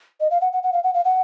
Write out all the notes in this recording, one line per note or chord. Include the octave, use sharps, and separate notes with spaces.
D#5
F5
F#5
F#5
F#5
F5
F#5
F5
F#5